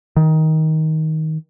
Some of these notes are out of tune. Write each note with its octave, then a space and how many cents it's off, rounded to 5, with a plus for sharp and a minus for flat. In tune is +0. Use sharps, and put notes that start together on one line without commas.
D#3 +15